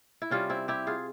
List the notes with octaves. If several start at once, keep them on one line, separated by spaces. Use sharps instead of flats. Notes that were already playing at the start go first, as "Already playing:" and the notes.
E4
C3 G3 C#4 F4
C4 E4
E4 G4
F4 G#4